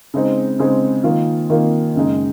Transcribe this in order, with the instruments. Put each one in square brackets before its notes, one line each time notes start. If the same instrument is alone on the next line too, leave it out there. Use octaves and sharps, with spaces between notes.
[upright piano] C#3 G#3 C4 D#4
C#3 G#3 C4 D#4
D#3 A#3 F4
D#3 A#3 F4
F#2 C#3 G#3 D#4